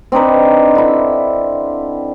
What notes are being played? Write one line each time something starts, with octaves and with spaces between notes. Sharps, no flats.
C4 D4 D#4 B4
D3 E4